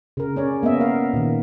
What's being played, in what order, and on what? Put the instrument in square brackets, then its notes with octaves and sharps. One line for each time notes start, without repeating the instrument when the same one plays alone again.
[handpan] C#3 A#4
C#4 C#5 D5
A#3 B3 D#5 E5
A#4 F5
A#2 D#3